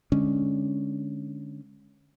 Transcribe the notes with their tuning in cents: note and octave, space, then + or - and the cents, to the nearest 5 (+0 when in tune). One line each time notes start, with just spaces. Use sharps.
D3 +0 G#3 +0 C#4 +0